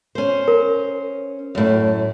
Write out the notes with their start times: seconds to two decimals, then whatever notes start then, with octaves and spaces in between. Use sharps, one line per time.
0.15 C#4 C5
0.48 A#4
1.55 F#2 A2